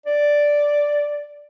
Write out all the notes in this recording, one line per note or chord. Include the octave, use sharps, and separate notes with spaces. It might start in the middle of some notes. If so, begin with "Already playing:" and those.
D5